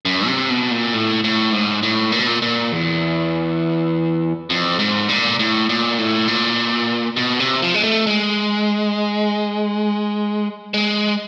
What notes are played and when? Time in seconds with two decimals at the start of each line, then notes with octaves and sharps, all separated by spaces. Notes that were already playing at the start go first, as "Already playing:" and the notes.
0.05 F#2
0.27 C3
0.50 B2
0.71 A#2
0.94 A2
1.24 A2
1.53 G#2
1.83 A2
2.12 A#2
2.19 B2
2.27 A#2
2.42 A#2
2.72 E2
4.50 F2
4.79 G#2
5.09 A#2
5.39 A2
5.69 A#2
5.98 A2
6.28 A#2
7.17 B2
7.40 C3
7.62 F3
7.74 G#3
7.84 A3
8.07 G#3
10.74 G#3